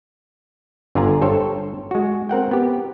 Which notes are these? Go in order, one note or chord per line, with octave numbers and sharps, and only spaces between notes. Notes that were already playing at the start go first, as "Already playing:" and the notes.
G1 D3 F4 D5 G#5 A#5
G2 A4 C5 C#5 G5
G#3 F#4
C4 A#4 F#5 G5
B3 G4